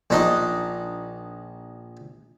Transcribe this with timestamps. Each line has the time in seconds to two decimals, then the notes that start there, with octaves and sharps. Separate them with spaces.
0.10 A#1 D4 D#4 D#5